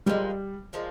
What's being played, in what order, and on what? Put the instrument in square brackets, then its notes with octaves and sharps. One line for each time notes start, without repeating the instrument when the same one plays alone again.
[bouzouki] A#2 F3 G#3 [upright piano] G3
[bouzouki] A#2 F3 G#3